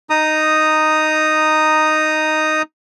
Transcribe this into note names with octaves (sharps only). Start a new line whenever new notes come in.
D#4 A#5 D#6